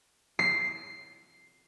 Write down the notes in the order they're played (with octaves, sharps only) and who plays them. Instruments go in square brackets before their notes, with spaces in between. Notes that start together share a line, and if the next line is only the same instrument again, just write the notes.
[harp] C7